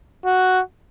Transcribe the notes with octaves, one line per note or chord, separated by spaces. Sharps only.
F#4